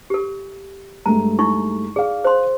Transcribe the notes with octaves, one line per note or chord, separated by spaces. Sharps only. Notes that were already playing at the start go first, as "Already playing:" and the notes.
G4 A4
G2 G#3 A3 A#5
D#4 E4 C#6
G#4 D5 F5
C5 C6